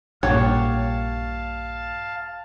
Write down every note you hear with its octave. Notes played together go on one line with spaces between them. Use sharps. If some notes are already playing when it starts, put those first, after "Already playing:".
A#1 G2 A#2 G4 C#5 F5 F#5 A5